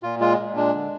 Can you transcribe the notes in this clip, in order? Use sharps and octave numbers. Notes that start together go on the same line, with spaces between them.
A#2 F4
G#3 F4
A#2
G#3 D4
D3